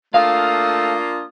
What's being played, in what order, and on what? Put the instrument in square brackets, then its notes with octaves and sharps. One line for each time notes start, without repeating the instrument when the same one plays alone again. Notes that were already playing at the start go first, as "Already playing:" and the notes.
[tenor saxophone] A3 [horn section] A#3 D4 F4 [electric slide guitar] F5 [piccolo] D#6